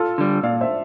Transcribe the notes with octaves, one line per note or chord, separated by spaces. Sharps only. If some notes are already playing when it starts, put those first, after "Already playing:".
Already playing: F4 A4
D3 G3
A#2 D5 F5
C5 E5